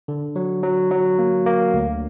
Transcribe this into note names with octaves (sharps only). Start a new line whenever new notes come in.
D3
F#3
F#3
F#3
A#3
A#3
D2